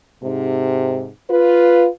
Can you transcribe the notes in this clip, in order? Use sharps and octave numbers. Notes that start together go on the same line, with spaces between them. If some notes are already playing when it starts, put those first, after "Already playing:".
G#2 C3
F4 B4